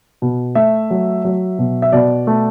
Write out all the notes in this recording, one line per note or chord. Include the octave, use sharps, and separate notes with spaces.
B2
A3 E5
F#3
F#3
B2
E5
B2 D5
A3